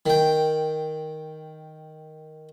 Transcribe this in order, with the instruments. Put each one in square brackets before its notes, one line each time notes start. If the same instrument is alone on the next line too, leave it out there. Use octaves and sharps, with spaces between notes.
[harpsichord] D#3 G5